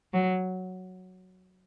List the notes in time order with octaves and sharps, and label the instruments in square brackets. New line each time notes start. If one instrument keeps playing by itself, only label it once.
[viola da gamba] F#3